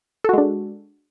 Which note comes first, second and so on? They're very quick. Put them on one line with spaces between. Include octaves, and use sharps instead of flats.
A4 F#4 G#3 D4